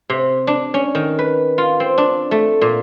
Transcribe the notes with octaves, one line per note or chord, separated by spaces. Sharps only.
C3
D4
C#4
D#3
B4
F4
C4
D4
A3
A#2